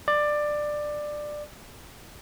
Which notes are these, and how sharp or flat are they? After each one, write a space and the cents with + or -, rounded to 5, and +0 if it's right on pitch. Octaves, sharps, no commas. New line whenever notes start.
D5 +15